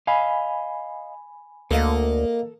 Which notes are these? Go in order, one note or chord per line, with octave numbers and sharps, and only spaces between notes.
D#5 F5 G#5 B5
D2 A#3 A4 D#5